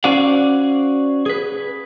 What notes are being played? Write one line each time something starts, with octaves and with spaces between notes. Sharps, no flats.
C#4 F#4 C5 D5 F5 F#5
G#4 B4